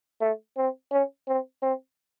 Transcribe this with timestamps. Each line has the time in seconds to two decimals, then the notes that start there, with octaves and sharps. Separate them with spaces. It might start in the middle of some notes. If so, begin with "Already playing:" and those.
0.21 A3
0.57 C4
0.91 C#4
1.28 C4
1.62 C4